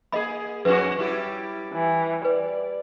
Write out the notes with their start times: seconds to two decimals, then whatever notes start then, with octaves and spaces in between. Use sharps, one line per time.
0.12 A#3 G#4 D#5 B5
0.65 F2 C#4 F#4 B4
0.99 G3 E4 G4
1.73 E3
2.25 B4 D5